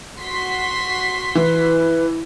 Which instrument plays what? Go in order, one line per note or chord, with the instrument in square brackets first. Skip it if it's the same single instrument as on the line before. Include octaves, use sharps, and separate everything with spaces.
[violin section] F#4 C6 B6
[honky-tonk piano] E3 [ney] E4 [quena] B4